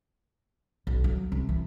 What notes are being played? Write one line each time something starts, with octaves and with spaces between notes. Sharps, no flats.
B1
F#3
C2
E3